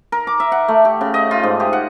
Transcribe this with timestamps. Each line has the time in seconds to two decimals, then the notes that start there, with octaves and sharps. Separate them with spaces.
0.12 A#4
0.27 D6
0.40 E5
0.52 F#5
0.68 A3
0.85 G4
1.01 C#3
1.14 D#5
1.31 F4
1.43 G#2
1.60 G4
1.73 F#5